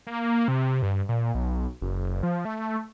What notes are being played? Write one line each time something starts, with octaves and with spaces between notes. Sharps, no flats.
A#3
C3
G2
A#2
B1
F#1
F3
A3